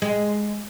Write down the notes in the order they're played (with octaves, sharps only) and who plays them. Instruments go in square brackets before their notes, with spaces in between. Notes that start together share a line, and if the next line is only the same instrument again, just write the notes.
[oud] G#3